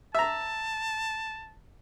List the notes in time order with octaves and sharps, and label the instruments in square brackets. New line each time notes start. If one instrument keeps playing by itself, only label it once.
[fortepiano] E5 A#5 [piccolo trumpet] A5